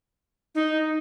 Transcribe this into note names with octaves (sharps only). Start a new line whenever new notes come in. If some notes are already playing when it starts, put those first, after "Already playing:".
D#4